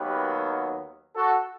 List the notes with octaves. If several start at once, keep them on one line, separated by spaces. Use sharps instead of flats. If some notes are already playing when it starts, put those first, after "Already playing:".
Already playing: D#2 D#3 F#3 B3 G4 B4
F#4 A4